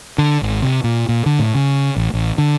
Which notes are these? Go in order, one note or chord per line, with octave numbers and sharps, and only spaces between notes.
D3
G#1
C3
A#2
A#2
D3
A2
C#3
A1
A1
D3